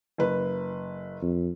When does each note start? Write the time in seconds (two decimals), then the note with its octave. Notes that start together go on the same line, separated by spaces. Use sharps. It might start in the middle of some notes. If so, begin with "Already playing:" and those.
0.18 F#1 B4
1.22 F2